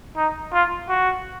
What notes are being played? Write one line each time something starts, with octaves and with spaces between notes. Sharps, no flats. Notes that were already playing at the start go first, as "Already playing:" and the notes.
D#4
F4
F#4